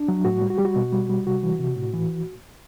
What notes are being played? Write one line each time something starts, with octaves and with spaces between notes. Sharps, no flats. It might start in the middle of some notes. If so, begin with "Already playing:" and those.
Already playing: D4
F#3
A2 F#4
G3
F#4
G3 G4
F#4
B2
G3
G3
C3 F#4
E3
C3
A2
E3